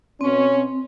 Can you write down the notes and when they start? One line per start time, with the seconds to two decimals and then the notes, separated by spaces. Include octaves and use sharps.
0.21 B2 C4 C#4